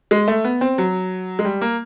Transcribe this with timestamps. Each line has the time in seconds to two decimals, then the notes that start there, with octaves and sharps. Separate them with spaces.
0.11 G#3
0.28 A3
0.45 B3
0.61 C4
0.78 F#3
1.39 G#3
1.45 G3
1.61 A#3